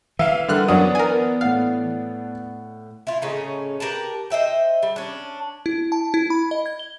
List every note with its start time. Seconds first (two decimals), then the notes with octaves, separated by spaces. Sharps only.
0.19 E3 E5 F5
0.48 D3 G3 A#4 F#5 F6 F#6
0.68 F#2 F#3 B3 D4 B4 F#5 D#6
0.95 A#4 G#5
1.41 A2 F5 F#5
3.07 E4 F4
3.22 A2 C#3 C#4 D#4
3.80 G4 A#4 B4 A5
4.30 C5 D#5 E5 G5
4.83 G3
4.96 C#4 D4
5.66 E4
5.92 A5
6.14 E4
6.30 B5
6.51 D#5
6.66 G#6
6.79 G7